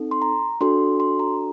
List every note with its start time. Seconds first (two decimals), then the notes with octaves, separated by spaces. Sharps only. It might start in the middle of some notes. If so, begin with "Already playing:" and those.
Already playing: C4 D#4 A4
0.11 C6
0.22 A#5
0.61 D4 F#4 A4 C6
1.00 C6
1.19 A#5